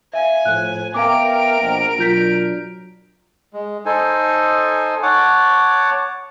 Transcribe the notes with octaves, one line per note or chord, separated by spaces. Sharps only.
E5 F5 G#5
A2 F3 F#6
B3 A#4 E5 F5 G5 D6 D7
A#1 B2
B2 F#3 D4 F4 G6 B6
G#3
D#4 A4 C5 G#5
C#5 F#5 A5 D6